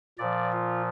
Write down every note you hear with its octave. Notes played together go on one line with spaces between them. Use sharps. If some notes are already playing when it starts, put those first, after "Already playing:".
A#2 F3 D5
F4